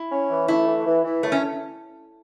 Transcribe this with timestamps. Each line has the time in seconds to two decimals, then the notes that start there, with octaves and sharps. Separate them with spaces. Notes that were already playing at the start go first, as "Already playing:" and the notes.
Already playing: E4
0.11 C#4
0.30 E3
0.48 A3 E4
0.67 E3
0.86 E3
1.04 E3
1.22 F#2 A3
1.32 C#4